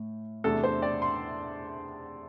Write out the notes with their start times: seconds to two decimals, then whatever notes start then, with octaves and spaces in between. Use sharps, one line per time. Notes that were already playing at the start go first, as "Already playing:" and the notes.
Already playing: A2
0.44 E2 C3 A3 D4 A4
0.64 C5
0.82 D5
1.02 C6